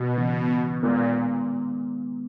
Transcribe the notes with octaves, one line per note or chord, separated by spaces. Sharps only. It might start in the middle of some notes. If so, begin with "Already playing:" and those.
Already playing: B2
C#3 E3 B3
D#2 A#2 D#3 G#3 B3